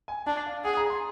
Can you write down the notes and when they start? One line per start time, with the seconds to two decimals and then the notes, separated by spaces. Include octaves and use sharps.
0.08 G#5
0.26 D4 A5
0.46 F5
0.64 G#4 F#5
0.77 A#5
0.90 C6